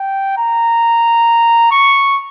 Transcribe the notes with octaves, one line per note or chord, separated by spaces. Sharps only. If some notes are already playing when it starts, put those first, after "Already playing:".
Already playing: G5
A#5
C#6